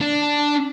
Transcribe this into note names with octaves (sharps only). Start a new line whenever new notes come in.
D4